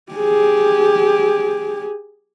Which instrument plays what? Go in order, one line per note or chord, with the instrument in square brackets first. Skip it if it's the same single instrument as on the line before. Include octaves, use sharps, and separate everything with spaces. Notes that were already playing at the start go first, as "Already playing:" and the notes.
[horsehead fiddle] G4 G#4